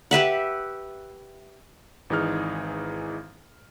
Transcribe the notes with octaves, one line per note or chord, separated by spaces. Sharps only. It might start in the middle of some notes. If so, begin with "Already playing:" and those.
G4 B4 E5 F#5
G#1 E3 D#4 G#4 F6